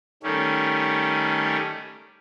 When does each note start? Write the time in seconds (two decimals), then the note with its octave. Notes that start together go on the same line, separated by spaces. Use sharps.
0.23 D#3 G3 A3 C#4